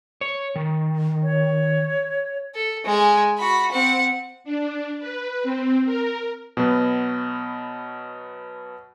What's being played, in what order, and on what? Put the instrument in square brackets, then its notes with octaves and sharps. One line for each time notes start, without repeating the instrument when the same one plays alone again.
[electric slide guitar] C#5
D#3
[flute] C#5
[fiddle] A4
G#3 G#5
F#4 B5
C4 F#5
[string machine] D4
B4
C4
A#4
[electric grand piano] B2 F#3 B3